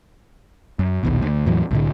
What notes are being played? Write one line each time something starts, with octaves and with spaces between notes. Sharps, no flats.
F#2
A#1 D#2 B2
D2
E2 A2 E3 F#3
C2 A2 D3